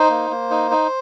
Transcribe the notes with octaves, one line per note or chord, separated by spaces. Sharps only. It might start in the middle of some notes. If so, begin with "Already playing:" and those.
Already playing: D#4 C5
A#3
A#3
D#4
D#4